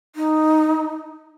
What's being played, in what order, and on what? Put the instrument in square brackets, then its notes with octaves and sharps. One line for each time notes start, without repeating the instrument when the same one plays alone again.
[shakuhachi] D#4